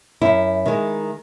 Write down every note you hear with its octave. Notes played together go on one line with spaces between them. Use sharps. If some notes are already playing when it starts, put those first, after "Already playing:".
F#2 E4
D#3 G#3